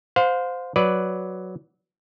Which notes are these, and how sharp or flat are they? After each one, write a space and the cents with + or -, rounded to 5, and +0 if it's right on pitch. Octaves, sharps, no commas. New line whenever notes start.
C5 -15 F5 +30
F#3 +0 B4 +0 D5 +0